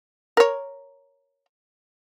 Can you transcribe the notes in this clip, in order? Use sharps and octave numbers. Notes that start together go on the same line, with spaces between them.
A#4 C#5